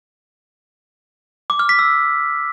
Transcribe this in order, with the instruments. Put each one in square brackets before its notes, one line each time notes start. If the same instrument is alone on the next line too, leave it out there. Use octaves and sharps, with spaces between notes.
[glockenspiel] D6
F6
B6
E6